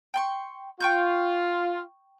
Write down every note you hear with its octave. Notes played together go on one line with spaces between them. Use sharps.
G5 C6 C#6
F4 G5 C#6 G6